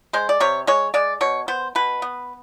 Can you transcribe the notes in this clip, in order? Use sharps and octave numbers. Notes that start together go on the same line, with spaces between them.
G#3 C5
D5
C3 C#5
G#3 C#5
G#3 D5
B2 C#5
B3 C5
B2 B4
B3